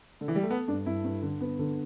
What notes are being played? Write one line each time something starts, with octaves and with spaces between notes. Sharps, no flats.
D3
E3
G3
A3
B3 A4
G2 D4
G2 E4
G2
D3
B3
D3